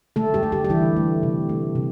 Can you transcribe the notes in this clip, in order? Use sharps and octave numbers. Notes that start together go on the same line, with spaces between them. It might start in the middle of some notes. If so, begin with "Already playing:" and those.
D3 A3 A4
G3 G4
A3
G3 G4
G4
D3 E3 E4
A3
C3
A3
C3